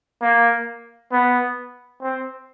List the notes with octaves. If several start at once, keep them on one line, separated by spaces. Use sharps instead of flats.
A#3
B3
C4